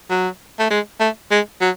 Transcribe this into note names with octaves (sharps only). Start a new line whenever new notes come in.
F#3
A3
G#3
A3
G#3
F#3